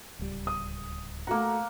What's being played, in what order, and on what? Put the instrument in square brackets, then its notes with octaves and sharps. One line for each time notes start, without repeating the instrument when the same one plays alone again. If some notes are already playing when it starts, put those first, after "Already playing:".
[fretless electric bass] D1 C#2 G3
[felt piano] D#6
[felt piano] A3 F#4 A#5 [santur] A#3 F#5